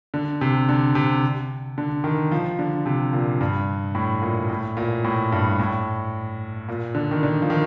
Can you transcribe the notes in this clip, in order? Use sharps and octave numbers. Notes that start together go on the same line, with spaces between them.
D3
C3
D3
C3
D3
D#3
F3
D3
C3
A#2
G2
A2
A#2
A2
A#2
A2
G2
A2
A#2
D3
D#3
D3
F3
D#3